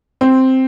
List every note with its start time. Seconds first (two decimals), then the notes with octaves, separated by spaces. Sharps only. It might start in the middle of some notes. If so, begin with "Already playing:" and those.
0.21 C4